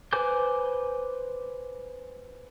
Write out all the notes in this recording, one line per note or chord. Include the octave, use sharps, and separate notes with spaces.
B4 C5 G#5 D6 G6